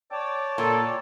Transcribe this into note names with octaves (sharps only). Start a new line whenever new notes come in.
C#5 D5 G5 A5 D6
A#2 A4